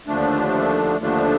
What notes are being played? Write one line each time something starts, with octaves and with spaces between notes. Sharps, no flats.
D#2 D3 F3 A3 D4
D#2 D3 F3 A3 D4